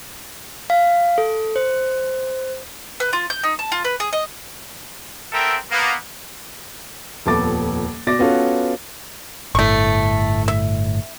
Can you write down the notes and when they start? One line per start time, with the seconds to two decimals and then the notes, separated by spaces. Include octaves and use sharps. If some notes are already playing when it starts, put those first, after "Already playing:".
0.70 F5
1.18 A4
1.56 C5
3.00 B4
3.13 F4
3.30 G6
3.43 D#4
3.59 A5
3.72 F4
3.85 B4
4.00 G#4
4.13 D#5
5.33 B3 C4 A4 A#4 E5 G5
5.71 A#3 B3
7.26 D#1 F2 B3 A4 D6 A6
8.07 B2 D5 D6 A6 A#6
8.19 B3 C#4 F4 F#4 A4 B4
9.55 G1 A2 A3 C#6
10.48 E5